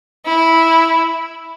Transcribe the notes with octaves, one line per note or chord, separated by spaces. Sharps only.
E4